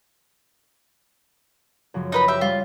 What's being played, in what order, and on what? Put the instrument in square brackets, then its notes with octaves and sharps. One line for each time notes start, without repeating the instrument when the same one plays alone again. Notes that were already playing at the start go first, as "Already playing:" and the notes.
[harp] F#2 C#3 F3
[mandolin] D#4 B4 B5
G4 E5
[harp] G3 C6 [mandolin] F4